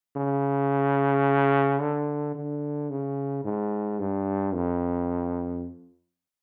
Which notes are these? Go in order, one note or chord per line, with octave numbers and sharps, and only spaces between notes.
C#3
D3
D3
C#3
G#2
G2
F2